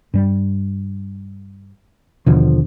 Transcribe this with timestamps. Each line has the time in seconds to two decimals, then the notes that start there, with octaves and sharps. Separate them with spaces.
0.14 G2 G3
2.26 D#2 B2 D3 F3